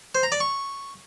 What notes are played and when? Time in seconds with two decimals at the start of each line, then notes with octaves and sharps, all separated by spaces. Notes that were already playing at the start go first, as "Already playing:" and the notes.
0.15 C5
0.23 A#5
0.32 D5
0.40 C#6